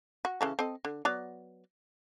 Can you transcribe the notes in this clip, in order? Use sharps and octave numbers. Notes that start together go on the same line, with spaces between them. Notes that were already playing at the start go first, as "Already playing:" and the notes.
F#4
C#3 E3 A4
C4 A4 D#5
D3
F#3 B3 D5